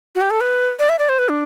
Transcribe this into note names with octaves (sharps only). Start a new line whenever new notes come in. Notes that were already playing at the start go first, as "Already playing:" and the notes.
F#4
G4
A4
B4
D5
E5
D5
C5
B4
D4